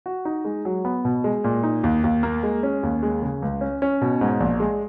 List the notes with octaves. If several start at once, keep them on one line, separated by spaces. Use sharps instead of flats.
F#4
D#4
G#3
F#3
B3
B2
G#3
A#2
D#4
D#2
D#2
A#3
G#3
C#4
D#2
G#3
C#3
C#2
C#4
C#4
B2
G#2
A#1
G#3